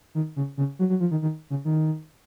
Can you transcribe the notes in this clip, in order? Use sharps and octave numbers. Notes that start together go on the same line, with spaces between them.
D#3
C#3
C#3
F#3
F#3
F3
D#3
D#3
C#3
D#3